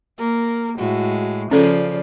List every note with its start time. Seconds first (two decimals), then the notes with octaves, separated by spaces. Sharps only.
0.19 A#3 A#4
0.77 A2 G#3 F#4
1.51 C#3 F3 C#4 A4 D5